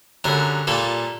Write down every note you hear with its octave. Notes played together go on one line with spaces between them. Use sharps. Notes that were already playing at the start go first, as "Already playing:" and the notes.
F#2 D3 G3 A#4
A#2 G3 A#3 A4